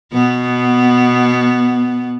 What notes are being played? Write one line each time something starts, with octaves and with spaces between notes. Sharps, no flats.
B2 B3